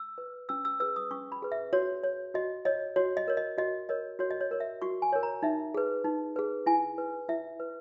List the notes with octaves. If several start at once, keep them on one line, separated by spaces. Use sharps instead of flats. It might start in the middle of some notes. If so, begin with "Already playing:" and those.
Already playing: E6
B4
C#4 E6
E6
G#4 B4 E6
D#6
C#4 C#6
B5
G#4 B4
E5
F#4 C#5
C#5
F#4 D#5
C#5 D#5
F#4 C#5
D#5
A#4 C#5
D#5
F#4 D#5
A#4 C#5 D#5
F#4 C#5
D#5
C#5
A#4 C#5
E5
F#4 C#6
G#5
A#4 C#5
A#5
D#4 E5
G#4 B4
D#4
G#4 B4
E4 G#5
B4
E4 E5
B4